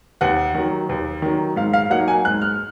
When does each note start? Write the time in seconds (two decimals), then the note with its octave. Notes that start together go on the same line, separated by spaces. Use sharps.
0.21 D#2 F#5
0.55 D#3 F#3
0.89 D#2
1.22 D#3 F#3
1.56 G#2 F5
1.73 F5
1.90 F#3 A#3 D#4 F#5
2.08 G#5
2.25 G#2 F#6
2.42 F6